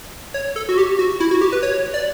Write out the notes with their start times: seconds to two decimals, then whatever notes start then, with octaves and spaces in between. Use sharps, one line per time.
0.34 C#5
0.56 A4
0.69 F#4
0.78 G4
0.99 F#4
1.20 E4
1.31 F#4
1.41 G4
1.52 B4
1.63 C#5
1.94 D5